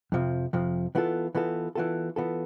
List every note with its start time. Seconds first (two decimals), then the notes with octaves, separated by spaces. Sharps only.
0.12 F2 C3 F3
0.53 F2 C3 F3
0.95 E3 B3 F4 A4
1.35 E3 B3 F4 A4
1.75 E3 B3 F4 A4
2.16 E3 B3 F4 A4